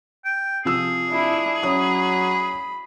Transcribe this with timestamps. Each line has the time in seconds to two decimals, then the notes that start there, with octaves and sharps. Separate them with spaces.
0.25 G5
0.65 C3 F3 G#4 E6
1.09 D4 E4
1.63 F#3 C#4 C#5 B5 D#6